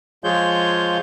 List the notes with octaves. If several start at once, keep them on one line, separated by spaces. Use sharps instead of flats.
F3 G#3 F4 G#4 C#5 G6